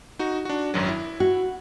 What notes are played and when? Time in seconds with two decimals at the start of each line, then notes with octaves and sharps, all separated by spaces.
0.19 D#4 F#4
0.45 D4 F#4
0.74 G#1 F#2 F#3
0.88 E4
1.20 F#4